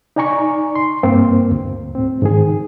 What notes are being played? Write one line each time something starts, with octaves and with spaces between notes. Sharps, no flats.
D#4 D5 G#5 A#5 C#6
C6
G2 A#3 C4
D2
A2 C4
G#2 D#3 G#4